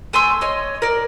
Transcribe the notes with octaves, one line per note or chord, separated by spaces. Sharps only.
A3 G#5 C6 E6
C#5 D#5 C6
A#4 D5